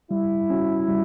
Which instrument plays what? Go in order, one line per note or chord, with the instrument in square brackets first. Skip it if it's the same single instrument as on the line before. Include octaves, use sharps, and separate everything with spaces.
[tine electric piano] G3 [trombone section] E4
[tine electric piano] C#4 F#4
G3